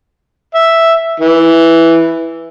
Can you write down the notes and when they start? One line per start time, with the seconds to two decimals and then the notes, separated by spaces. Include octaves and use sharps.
0.55 E5
1.20 E3